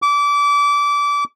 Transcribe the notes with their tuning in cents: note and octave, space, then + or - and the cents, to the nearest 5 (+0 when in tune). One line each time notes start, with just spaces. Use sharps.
D6 -25